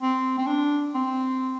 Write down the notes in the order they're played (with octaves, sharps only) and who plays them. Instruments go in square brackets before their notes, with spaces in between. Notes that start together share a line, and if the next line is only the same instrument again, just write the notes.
[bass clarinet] C4
C4
D4
C4